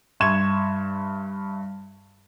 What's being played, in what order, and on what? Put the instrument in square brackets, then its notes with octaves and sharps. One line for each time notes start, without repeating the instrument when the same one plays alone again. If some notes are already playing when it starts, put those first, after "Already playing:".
[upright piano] G2 E5 C6 C#6 G#6 E7